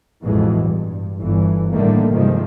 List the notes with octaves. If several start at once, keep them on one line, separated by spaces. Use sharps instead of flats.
A1 F2 B2 E3 G#3
G2
G1 E3
A2 D3 D#3 G3 A3 A#3
G2 C3 D#3 F3 G3 G#3